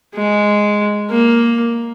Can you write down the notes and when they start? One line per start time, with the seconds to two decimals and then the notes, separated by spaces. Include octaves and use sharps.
0.15 G#3
1.11 A#3